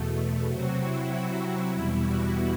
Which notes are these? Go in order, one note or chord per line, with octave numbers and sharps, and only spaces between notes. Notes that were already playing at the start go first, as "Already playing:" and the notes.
Already playing: E2 B2 A3
C3 F#3 C4 F#4
E4
F#4
E2 B2 G3 E4
F#4